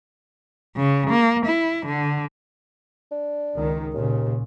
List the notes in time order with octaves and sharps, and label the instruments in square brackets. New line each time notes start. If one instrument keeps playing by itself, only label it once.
[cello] C#3
A#3
E4
D3
[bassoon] D4
[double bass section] C#2 D#3
[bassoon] D#2 [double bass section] A#2 C#3